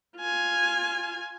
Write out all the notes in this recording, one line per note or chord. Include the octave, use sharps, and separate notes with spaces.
F4 G#5